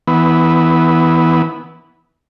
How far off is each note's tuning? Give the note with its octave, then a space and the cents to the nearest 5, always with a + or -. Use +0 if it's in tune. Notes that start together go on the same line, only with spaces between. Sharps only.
E3 -20 B3 +0